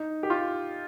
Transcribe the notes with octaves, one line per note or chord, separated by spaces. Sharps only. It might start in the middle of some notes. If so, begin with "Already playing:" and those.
Already playing: D#4
G4
F4